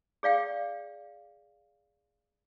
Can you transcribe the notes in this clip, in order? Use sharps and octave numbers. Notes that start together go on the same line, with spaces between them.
G#4 D5 F5 G5